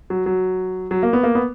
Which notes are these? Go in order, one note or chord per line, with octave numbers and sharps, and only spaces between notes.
F#3
F#3
F#3
A#3
B3
A#3
B3